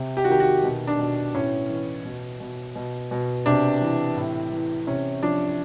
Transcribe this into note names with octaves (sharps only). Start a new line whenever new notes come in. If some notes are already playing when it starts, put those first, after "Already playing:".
Already playing: C3
G4
F#4
D#3 G4
F#4
B2
D4
B2
A2 C#4
E3
B2
B2
B2
B2
C3 D4
E3
A2
E3
C3 C#4
F3 D4